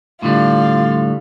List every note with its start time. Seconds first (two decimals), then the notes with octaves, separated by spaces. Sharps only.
0.23 A2 D3 G3 F4